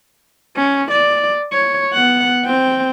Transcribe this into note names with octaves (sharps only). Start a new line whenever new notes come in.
C#4
D5
C#5
B3 F#5
C4 G5